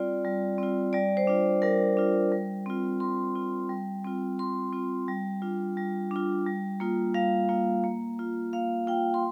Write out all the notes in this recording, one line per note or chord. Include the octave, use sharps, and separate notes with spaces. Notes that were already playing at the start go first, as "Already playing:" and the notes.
Already playing: G3 C4 F4 D5
G3
C4 F4
G3 D5
C5
D4 F4
G3 A#4
D4 F4
G3
C4 F4
G3 C6
C4 F4
G3
C4 F4
G3 C6
C4 F4
G3
D4 F4
G3
D4 F4
G3
A#3 F4
G3 F5
A#3 F4
A#3
F4
A#3 F5
F4 G5
C6